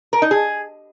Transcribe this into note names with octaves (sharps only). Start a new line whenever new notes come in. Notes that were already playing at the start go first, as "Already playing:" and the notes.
A#4
D#4
G#4